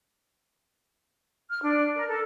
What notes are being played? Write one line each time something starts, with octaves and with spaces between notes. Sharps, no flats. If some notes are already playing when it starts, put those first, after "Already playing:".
F6
D4
A#4
A4